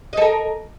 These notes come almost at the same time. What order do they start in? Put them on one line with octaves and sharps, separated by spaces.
D#5 A4 A#4